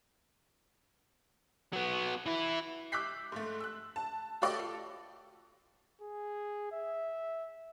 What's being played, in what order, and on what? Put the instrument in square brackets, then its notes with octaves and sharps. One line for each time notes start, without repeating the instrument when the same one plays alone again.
[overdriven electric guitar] F#3 B3
E3 E4
[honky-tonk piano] D6 E6 F#6 G6 B6 C7
G#2 A3
E6 F#6
A5
A3 F#4 G4 D5 D#5 E6
F4 A4
[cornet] G#4
E5